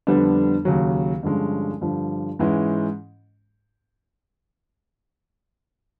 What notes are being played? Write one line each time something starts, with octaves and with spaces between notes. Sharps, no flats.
F2 D3 G3 B3 D4
D#2 C#3 F#3
G2 D3 F3 G#3 C#4
G2 D3 F3
G#2 E3 G#3 C#4